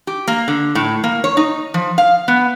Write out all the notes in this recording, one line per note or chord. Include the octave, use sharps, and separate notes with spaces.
G4
A#3
D3
A2
A#3
C#5
D#4
F3
F5
B3